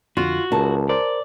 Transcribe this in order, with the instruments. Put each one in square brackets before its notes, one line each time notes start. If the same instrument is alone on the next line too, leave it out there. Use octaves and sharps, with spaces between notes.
[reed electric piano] F2 D3 [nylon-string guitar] F4 [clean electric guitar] F#4
[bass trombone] C#2 [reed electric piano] A#4 [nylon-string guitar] A5
[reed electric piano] A#4 C5 [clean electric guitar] D5